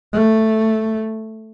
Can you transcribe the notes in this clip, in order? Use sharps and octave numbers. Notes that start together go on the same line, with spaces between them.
A3